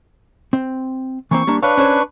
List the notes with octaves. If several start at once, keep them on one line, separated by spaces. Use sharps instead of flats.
C4
E3 A#3 C4 C#6
G3 A#3 D4
D4 B4 C#5 F5 C#6
C#4 C5 C#5